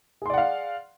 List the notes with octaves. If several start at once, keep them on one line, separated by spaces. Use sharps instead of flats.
G#4 D5 F5 F#5 C6